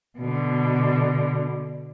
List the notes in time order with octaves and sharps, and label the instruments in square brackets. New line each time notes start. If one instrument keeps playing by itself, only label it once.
[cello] B2 D3